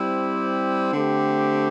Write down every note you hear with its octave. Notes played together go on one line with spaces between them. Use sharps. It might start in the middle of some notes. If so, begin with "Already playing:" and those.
Already playing: G3 C4 E4 G4 C5
D3 A3 C4 G4